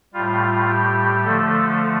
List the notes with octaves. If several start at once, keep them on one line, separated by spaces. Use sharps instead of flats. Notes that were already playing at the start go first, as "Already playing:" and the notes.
A2 G3 F4
G4
D3 F3 A3 A4